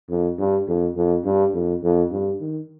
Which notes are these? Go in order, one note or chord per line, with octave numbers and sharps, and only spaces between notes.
F2
G2
F2
F2
G2
F2
F2
G2
D#3